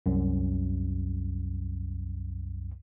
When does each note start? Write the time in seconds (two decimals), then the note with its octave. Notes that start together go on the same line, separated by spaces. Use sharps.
0.06 C2 F#2